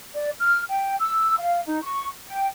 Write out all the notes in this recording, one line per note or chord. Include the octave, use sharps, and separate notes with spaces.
D5
F6
G5
E6
F5
D#4
C#6
G5